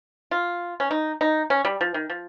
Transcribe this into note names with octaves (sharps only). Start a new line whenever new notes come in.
F4
C#4
D#4
D#4
C#4
G3
F3
D#3
F3